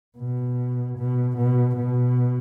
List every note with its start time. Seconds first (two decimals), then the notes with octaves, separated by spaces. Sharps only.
0.18 B2
0.97 B2
1.37 B2
1.76 B2